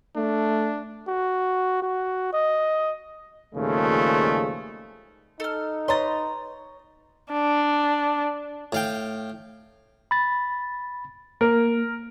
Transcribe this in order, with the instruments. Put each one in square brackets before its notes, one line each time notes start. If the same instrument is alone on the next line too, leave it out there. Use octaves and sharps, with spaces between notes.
[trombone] A3 [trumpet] D4
[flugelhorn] F#4
F#4
D#5
[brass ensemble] D#2 A#2 C#3 F3 G#3 A3
[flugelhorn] D#4 [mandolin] A4 F6
[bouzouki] B4 D#5 A#5 [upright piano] C#5 A6 [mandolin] C6 D#6
[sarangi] D4
[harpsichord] A2 F5 G5
[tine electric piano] B5 A6
[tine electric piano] A#3 [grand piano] A#4